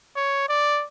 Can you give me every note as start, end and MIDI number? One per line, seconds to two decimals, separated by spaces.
0.16 0.47 73
0.49 0.85 74